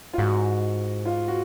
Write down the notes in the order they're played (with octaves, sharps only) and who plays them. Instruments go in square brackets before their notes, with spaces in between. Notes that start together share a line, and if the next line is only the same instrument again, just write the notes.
[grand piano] F4
[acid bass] G#2 [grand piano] F#4
[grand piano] F4
F#4